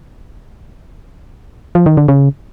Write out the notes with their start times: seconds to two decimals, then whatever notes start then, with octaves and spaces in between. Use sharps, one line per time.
1.75 F3
1.86 D#3
1.97 D3
2.08 C#3